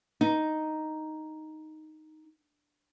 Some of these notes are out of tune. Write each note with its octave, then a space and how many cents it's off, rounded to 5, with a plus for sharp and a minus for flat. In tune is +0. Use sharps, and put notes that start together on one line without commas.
D#4 +0